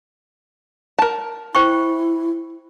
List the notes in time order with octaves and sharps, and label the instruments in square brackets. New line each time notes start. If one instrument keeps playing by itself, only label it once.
[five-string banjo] A#4 A5
[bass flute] E4 [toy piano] C5 G5 C#6